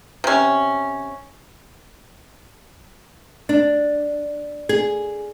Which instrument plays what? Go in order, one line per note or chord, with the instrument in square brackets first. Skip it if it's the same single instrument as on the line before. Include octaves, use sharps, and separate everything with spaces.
[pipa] C3 C#4
[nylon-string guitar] D4
G#4